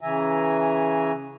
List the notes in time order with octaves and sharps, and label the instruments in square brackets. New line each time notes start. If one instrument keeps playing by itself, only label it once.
[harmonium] C#3 E3 E5 G#5 A#5